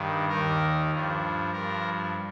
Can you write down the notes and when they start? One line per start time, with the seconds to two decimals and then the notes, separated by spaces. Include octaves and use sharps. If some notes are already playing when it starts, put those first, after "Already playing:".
Already playing: G2 D#3
0.29 D#2 D#3 A#4
0.90 G2 F3
1.53 G2 F3 A#4